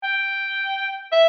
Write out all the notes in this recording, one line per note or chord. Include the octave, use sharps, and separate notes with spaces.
G5
E5